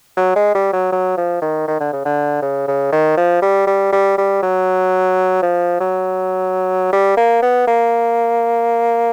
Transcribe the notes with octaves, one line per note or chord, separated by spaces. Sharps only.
F#3
G#3
G3
F#3
F#3
F3
D#3
D#3
D3
C#3
D3
C#3
C#3
D#3
F3
G3
G3
G3
G3
F#3
F3
F#3
G3
A#3
B3
A#3